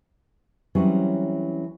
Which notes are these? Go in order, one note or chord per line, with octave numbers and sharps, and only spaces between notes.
E3 F#3 G3 C4 C#4